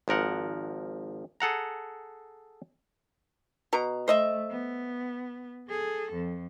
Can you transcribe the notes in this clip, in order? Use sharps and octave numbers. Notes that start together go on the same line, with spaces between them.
G#1 F3 A#4 F#5
G#4 A4 F#5 A#5
B2 A#5
A3 C5 D#5 E5
B3
G#4 A4
F2